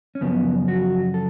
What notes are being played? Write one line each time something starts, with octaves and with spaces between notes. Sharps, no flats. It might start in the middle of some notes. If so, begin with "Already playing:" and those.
C#4
F#2 C#3 F3 B3
F#4
A4